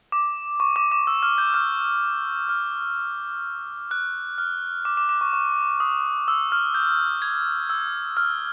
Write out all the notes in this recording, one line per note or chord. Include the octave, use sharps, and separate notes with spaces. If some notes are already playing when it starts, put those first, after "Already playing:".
D6
C#6
D6
D6
E6
F6
G6
F6
F6
F#6
F6
D6
D6
D6
C#6
C#6
D#6
E6
F6
G6
G#6
E6
F6